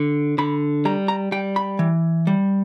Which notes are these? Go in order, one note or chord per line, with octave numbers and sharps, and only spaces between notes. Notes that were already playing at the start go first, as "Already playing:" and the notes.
Already playing: D3
D3 B5
G3 A#5
A#5
G3 G5
B5
E3
G3